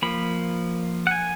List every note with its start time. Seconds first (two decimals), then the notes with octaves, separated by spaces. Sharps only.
0.02 F3 A#3 B5
1.07 F#5
1.11 G#5